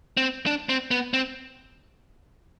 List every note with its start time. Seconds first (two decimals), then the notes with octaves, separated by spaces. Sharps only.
0.17 C4
0.46 D4
0.69 C4
0.91 B3
1.14 C4